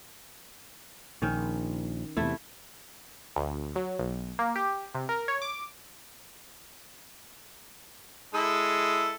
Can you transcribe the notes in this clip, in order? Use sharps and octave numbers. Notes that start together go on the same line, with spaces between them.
A#1 D#3 C#4
E2 C3 A3 E4
D2
F#3
B1
A#3
G4
C3
A#4
C#5
D6
G#3 E4 A4